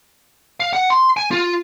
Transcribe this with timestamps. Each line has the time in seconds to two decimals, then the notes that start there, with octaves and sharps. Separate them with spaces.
0.60 F5
0.73 F#5
0.90 C6
1.17 G#5
1.31 F4